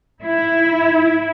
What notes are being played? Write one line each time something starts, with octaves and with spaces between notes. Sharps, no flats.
E4